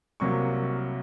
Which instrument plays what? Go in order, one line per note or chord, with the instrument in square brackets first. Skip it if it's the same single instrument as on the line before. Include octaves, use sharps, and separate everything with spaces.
[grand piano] C2 C3 F#3 A#3 C#6